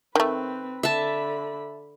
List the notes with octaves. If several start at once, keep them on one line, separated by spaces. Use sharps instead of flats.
D#3 A3 C4 B4
D3 E5 A5 B5